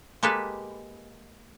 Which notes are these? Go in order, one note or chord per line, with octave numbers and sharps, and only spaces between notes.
G#3 A#3 G4 A4 B4